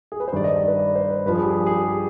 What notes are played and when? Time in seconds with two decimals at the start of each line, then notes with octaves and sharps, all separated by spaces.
0.12 G#4
0.20 B4
0.28 C5
0.32 G2 D#3 G3 D5
0.44 D#5
0.56 D5
0.68 B4
0.79 D5
0.95 C5
1.10 B4
1.26 G2 F3 B4
1.34 G#4
1.42 G4
1.50 G#4
1.67 G#4
1.73 G4
1.88 G4